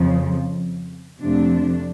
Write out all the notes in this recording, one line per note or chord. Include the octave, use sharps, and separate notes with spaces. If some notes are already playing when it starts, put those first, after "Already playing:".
Already playing: F2 C#3 F3
F2 C3 F3 A3 D4